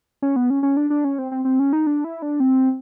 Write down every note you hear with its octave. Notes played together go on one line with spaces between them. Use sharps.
C#4
B3
C#4
C#4
D4
D4
C#4
C4
C4
C4
C#4
D#4
D4
E4
D4
C4